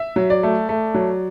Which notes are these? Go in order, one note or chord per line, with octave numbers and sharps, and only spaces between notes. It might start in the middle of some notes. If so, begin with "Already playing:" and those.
Already playing: E5
F#3
D5
A3
A3
F#3